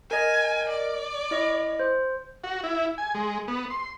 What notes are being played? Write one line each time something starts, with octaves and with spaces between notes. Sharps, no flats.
A#4 D#5 G#5
D5
E4 D#5
C5
F#4
E4
G#5
G#3
B3
C6